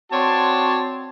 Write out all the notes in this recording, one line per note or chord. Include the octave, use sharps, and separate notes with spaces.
C4 F#4 C#5 D5 A5 C6